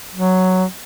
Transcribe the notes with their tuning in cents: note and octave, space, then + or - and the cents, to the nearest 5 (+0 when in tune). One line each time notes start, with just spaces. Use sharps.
F#3 +0